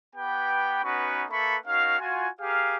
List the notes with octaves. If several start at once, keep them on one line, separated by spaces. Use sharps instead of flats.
B3 G4 B4 G5
B3 C#4 D#4 F#4 B4 C#6
A#3 A4 B4 E5 B5 C#6
C#4 D#4 F#4 A#4 F5
F4 F#4 G#5
G4 G#4 A#4 F5